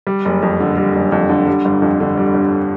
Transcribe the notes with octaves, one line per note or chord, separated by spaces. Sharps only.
G3
F#1
F2
D3
G3
F#1
F2
D3
G3
G1
F2
D3
G3
G1